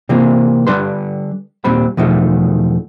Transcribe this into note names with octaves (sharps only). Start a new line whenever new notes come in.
C3 E3 A#3 C4 F4
D3 G3 D4 B4 C6
D#2 A#2 G3 C4 B5
E2 B2 D#3 F3 A3